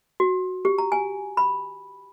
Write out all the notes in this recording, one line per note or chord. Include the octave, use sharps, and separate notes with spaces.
F#4
G4
A#5
G#5
B5